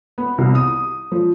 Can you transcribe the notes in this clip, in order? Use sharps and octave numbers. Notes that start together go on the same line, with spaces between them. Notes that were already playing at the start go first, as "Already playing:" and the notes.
B3
C2
D#6
F3